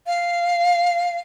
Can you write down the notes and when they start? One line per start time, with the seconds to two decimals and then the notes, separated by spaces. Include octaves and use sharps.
0.07 F5